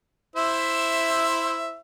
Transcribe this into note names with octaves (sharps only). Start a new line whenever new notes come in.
E4 C5 E5